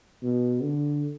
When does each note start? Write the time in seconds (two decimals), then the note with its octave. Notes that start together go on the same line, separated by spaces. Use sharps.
0.22 B2
0.62 D3